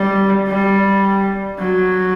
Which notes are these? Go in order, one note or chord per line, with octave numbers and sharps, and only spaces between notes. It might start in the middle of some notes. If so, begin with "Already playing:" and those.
Already playing: G3
G3
F#3